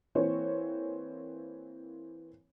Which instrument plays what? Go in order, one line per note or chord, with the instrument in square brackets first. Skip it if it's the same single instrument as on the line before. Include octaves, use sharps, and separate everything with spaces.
[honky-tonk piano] E3 A#3 C4 C5 C#5